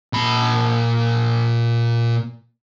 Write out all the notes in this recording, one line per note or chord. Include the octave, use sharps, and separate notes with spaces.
A#2 B5